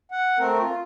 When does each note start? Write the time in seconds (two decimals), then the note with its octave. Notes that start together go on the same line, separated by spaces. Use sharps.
0.11 F#5
0.39 A3 C4 A#4
0.61 F4